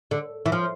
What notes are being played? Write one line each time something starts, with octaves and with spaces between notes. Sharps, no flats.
D3
E3
F3